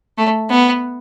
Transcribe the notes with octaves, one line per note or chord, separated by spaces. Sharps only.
A3
B3